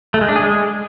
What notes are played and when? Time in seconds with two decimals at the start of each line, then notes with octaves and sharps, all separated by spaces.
0.14 A3
0.21 G#3
0.29 D4
0.36 G#4
0.43 G#3